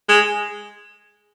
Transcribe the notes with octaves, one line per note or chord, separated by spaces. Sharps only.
G#3